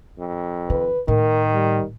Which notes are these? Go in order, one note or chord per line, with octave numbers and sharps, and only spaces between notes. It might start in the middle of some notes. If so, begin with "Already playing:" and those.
F2
D#3 B4
A2 D#3 A#4
G3